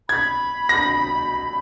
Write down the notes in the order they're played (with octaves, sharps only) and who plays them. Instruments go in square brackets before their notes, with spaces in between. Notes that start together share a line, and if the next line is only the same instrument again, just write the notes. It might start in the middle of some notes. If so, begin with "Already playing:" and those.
[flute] B5 [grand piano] G#6
[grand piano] A#6